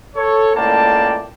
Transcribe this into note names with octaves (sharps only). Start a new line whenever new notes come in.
A4 C#5
C#2 A2 A#3 D5 G5 A5